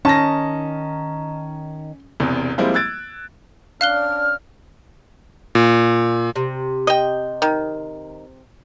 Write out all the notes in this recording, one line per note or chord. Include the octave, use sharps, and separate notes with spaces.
D#3 C#4 D#4 A5 A#6
E1 E2 C3
F3 G3 G#3 A#3 C4 E4
E6 F#6 G#6 A6 D7
C#4 D4 D5 F5 F6 F#6 G7
A#2
C3
D#5 G5
D#3